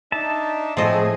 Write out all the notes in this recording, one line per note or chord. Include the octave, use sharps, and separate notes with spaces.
D4 D#4 E5 A5
A2 F3 A3 C4 G#4 D#5